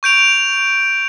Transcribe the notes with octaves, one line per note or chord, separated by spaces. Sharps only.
C#6 G6 D7 F7